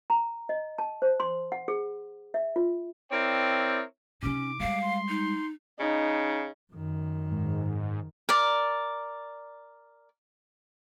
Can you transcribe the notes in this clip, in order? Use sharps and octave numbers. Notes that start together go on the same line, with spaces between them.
A#5
D#5
A5
C5
C6
F#5
G#4
E5
F4
C4 E4 A#4 C#5 D5 G5
C3 C#4 D#4 D6
G3 G#3 F5
C6
D#4
C#3 D#4
F#2 D#3
G#2
A#4 D5